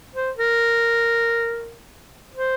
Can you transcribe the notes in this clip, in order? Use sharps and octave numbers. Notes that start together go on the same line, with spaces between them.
C5
A#4
C5